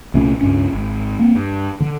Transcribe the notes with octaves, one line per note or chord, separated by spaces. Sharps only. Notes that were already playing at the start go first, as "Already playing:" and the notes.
C2 A#2 A3 C#4
C#2 G2 C#4
G#1
A#3 C4
G2
D3